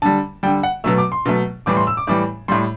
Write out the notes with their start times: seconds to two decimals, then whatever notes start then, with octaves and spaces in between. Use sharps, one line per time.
0.02 D3 G3 A5
0.43 G3 G5
0.46 D3
0.63 F#5
0.84 B2 F#3 A3 E6
0.98 D6
1.12 C6
1.26 B2 F#3 A3
1.66 A2 E3 G3 D6
1.77 C6
1.87 E6
1.97 D6
2.07 A2 E3 G3 D6
2.48 A2 G3 C6